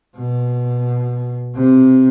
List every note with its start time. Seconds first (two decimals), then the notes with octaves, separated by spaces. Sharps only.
0.16 B2
1.56 C3